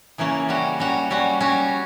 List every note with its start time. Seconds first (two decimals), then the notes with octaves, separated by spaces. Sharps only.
0.18 C#3 E3 A#3 C#4
0.49 G3 C#4 F#4
0.79 G3 C#4 F#4
1.10 G3 C#4 F#4
1.40 G3 C#4 F#4